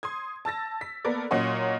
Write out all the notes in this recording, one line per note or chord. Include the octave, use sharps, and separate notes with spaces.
C6 D#6 G#6
A5 E6 A6 A#6
B6
A#3 B3 A4 A#4 D5
A#2 F#3 C#4 D#5 F#5 C6